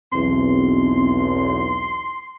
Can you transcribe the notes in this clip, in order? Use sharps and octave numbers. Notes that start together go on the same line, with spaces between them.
B1 E2 C4 C6